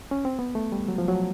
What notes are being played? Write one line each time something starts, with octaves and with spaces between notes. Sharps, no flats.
C#4
C4
B3
A3
G3
F#3
F3
F#3